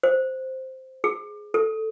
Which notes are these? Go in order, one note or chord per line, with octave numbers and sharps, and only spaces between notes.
C5
G#4
A4